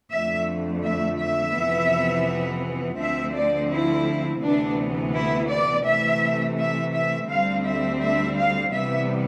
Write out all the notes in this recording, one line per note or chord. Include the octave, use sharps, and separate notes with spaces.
F2 D3 A3 E5
E5
E5
F2 C3 E3 B3
D2 D3 F3 C4 E5
D5
E4
D2 C3 E3 B3 D4
E4
D5
C3 E3 A3 E5
E5
E5
D2 D3 G3 C4 F5
E5
E5
F5
C3 E3 G3 B3 E5